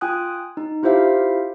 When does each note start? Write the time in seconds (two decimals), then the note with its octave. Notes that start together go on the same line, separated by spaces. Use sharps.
0.01 F4 G5 G#5 D#6 F#6
0.57 D#4
0.83 E4 F4 G4 C5 E5 F5